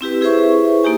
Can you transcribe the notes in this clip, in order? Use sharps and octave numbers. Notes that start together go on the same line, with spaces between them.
C4 E4 G4 B4
E4 G#4 B4 C5 E5 C#6
A#3 D#4 G4 G#5